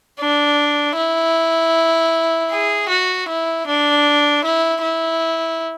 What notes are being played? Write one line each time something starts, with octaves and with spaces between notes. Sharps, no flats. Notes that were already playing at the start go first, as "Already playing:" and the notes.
D4
E4
G#4
F#4
E4
D4
E4
E4